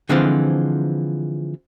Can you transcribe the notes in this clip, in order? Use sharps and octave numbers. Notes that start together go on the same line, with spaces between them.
D3 E3 F3 G#3 C4 F4